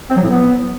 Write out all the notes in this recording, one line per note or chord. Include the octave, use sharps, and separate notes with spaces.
C4
F#3
A2
B3